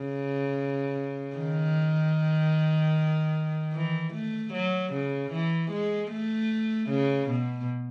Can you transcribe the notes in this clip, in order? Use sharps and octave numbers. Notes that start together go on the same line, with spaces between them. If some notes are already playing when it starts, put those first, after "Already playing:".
Already playing: C#3
D#3
E3
A3
F#3
C#3
E3
G#3
A3
C#3
B2